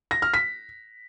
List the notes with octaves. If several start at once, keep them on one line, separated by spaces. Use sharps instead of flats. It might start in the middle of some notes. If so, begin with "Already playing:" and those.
A#6
F6
B6